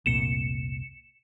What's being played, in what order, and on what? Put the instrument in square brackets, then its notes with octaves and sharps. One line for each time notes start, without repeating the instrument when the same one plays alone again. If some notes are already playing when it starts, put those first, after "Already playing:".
[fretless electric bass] F1 C2 A#2 [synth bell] C#7 E7